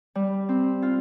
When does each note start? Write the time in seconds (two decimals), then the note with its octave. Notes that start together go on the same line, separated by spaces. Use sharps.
0.15 G3
0.49 C4
0.82 F4